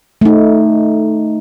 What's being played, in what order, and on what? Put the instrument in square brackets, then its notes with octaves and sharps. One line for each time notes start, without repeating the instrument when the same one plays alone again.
[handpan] A3 D#4